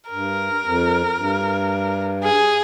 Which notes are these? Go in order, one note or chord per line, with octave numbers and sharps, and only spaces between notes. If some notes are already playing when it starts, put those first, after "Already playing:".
G2 A#4
F2
G2
G#4